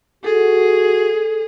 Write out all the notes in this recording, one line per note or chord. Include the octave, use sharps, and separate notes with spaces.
F#4 G#4 A4